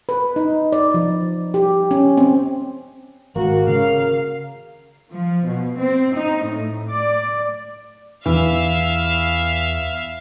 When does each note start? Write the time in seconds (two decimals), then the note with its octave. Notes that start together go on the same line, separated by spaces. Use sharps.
0.09 B4
0.36 D#4
0.72 D5
0.94 F3
1.54 G4
1.91 C#4
2.17 C4
3.36 G#1 A#3 F#4
3.68 C#3 F5
5.11 F3
5.45 B2
5.79 C4
6.15 D#4
6.45 A2
6.91 D5
8.26 E2 E3 E5 F5